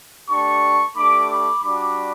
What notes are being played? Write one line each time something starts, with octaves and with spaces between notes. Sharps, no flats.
A3 D4 G4 A5 C#6
A3 D4 G4 B5 D6
B5 D6
G3 D4 F#4 B5 D6